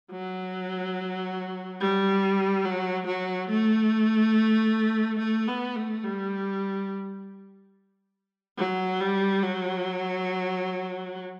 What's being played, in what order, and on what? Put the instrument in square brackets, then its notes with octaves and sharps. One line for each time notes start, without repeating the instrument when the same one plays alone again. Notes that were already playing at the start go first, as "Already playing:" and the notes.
[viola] F#3
G3
F#3
F#3
A3
A3
B3
A3
G3
F#3
G3
F#3